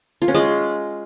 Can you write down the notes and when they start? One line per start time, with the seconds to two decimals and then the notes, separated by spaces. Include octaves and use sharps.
0.22 F4
0.28 C#4
0.34 G#3